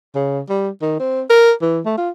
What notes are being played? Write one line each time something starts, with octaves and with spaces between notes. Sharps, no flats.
C#3
G3
D#3
C4
A#4
E3
A3
F4